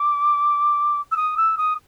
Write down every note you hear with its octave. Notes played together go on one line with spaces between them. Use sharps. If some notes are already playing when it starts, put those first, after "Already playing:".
Already playing: D6
E6
D#6
E6
D#6